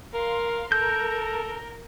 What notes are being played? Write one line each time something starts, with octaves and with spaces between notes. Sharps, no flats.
A#4 F5 C6
A4 A#4 G6